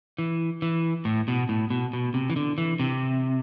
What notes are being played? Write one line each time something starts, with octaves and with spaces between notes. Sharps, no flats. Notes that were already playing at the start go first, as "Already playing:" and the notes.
E3
E3
A2
B2
A2
B2
B2
C3
E3
D3
E3
C3